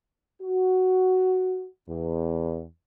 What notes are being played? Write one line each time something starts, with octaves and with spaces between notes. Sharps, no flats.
F#4
E2